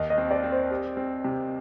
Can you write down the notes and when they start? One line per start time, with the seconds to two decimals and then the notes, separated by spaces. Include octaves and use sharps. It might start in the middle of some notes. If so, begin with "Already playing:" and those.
Already playing: D#2 D#5
0.10 D#5
0.18 C4
0.31 D5
0.43 C4
0.50 C5
0.71 G4
0.97 C4
1.24 C3